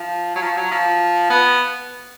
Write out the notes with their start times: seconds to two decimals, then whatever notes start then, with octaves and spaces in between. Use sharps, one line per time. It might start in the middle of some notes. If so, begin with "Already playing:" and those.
Already playing: F3
0.35 F#3
0.42 F3
0.57 F#3
0.71 F3
1.30 B3